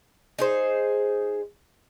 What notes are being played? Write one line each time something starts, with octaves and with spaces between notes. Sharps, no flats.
D#4 G#4 C5